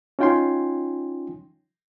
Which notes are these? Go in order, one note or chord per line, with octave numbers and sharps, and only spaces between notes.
C#4 D#4 F4 G5 G#5 C6